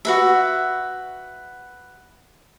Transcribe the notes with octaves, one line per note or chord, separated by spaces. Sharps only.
F#4 B4 E5